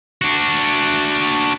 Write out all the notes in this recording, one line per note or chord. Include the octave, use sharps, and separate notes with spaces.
D4 F#4